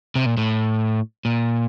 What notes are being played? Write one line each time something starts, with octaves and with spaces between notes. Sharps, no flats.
C3
A#2
A2
A#2